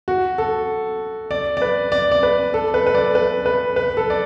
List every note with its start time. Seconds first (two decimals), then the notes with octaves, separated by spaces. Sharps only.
0.08 F#4
0.38 A4
1.31 D5
1.57 D5
1.62 B4
1.92 D5
2.11 D5
2.23 B4
2.54 A4
2.74 B4
2.87 B4
2.95 D5
3.15 B4
3.46 B4
3.76 B4
3.97 A4
4.10 D5